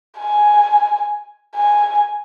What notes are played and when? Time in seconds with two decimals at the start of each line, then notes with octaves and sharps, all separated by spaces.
0.19 G#5
1.56 G#5